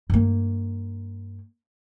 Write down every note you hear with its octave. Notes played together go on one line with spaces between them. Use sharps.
G2 A#3